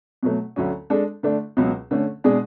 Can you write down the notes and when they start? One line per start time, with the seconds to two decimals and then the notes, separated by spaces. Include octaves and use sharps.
0.23 B2 F#3 A3
0.56 D2 D3 F#3 C#4
0.90 G#3 D4 A4
1.23 D3 A3 D4
1.57 C#2 B2 F#3
1.91 D3 A3 C#4
2.24 B2 G#3 D4 G#4